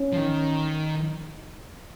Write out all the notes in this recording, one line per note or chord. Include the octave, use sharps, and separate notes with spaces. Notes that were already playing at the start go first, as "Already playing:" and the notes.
Already playing: C#4
F3
D#3